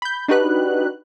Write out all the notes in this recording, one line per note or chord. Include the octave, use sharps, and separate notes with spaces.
B5 G6
D4 D#4 F#4 G4 B4 F#6